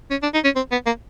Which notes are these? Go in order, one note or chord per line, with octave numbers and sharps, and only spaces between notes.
C#4
D4
D#4
C#4
C4
B3
A#3